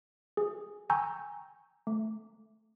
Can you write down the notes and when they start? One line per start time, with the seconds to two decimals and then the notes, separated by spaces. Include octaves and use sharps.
0.37 G#4
0.90 G5 G#5 A#5 C#6 E6 G6
1.87 A3